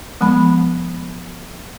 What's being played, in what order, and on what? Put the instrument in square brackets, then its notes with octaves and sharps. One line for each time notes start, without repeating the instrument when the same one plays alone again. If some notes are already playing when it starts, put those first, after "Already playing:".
[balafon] F3 G#3 B3 B5